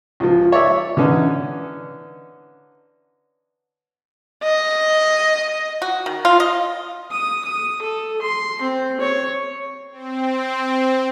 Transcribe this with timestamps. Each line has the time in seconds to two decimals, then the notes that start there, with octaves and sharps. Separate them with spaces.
0.20 C#2 F3
0.52 C#5 D5 E5
0.97 D3 E3 C#4 D#4
4.43 D#5
5.82 F#4
6.06 D#3
6.25 F4
6.40 D#5
7.11 D#6
7.45 D#6
7.82 A4
8.22 C6
8.62 C4
9.00 C#5
9.92 C4